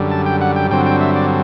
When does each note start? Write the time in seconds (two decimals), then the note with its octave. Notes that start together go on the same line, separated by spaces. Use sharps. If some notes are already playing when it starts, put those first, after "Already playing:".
Already playing: F#2 D3 G3
0.11 A5
0.26 G5
0.41 F#5
0.56 G5
0.71 G2 D3 F#3 C4 G5
0.86 G5
1.01 E5
1.16 D5